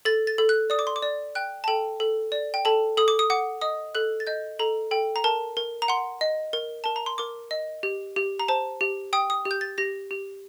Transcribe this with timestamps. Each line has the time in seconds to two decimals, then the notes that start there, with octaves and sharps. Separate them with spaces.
0.05 A4 A6
0.27 A6
0.38 A4
0.49 F#6
0.70 D5 D#6
0.79 D6
0.87 C6
0.96 D6
1.02 D5
1.35 G5 F#6
1.64 A5
1.68 A4 G5
2.00 A4
2.32 D5
2.54 G5
2.65 A4 A5
2.97 A4 D#6
3.08 D6
3.19 D#6
3.30 F#5 D6
3.61 D#5 D#6
3.95 A4 F#6
4.20 A6
4.27 D#5 G6
4.59 A4 A#5
4.91 A4 G5
5.16 A#5
5.24 A#4 A5
5.57 A#4
5.82 A#5
5.88 F#5 C6
6.21 D#5
6.53 A#4
6.84 A#4 A5
6.96 A#5
7.06 C6
7.18 A#4 D6
7.51 D#5
7.83 G4
8.16 G4
8.39 A#5
8.48 C5 A5
8.81 G4
9.13 G5 D#6
9.30 D#6
9.45 G4
9.51 G6
9.61 A6
9.78 G4 A#6
10.11 G4